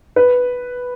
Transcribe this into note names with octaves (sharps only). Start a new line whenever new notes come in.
B4